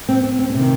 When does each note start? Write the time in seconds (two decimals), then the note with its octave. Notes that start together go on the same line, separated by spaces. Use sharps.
0.09 C4
0.23 C4
0.39 C4
0.50 C#4
0.54 C3 D#3 C4